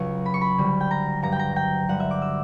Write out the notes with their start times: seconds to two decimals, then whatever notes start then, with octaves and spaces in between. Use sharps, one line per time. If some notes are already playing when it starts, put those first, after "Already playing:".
Already playing: C#2 C#3 F#3 C#6
0.26 B5
0.34 C#6
0.41 B5
0.58 D2 D3 G3
0.81 G5
0.91 A#5
1.22 G2 F#3 A#5
1.32 G5
1.39 A#5
1.56 G5
1.88 G2 D3 G3 F#5
2.00 E5
2.11 D6
2.22 E6